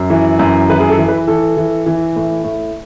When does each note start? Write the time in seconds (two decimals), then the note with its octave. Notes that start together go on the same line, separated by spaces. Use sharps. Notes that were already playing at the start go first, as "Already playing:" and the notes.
Already playing: F#2
0.10 E3
0.39 F#2
0.70 E3 B4
0.80 G#4
0.89 A4
0.98 E3
1.08 B4
1.27 E3 A4
1.57 E3
1.86 E3
2.16 A2
2.44 A2